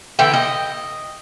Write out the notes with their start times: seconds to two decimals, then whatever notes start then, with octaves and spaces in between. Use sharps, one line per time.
0.19 D3 E3 E5 G5
0.34 D#5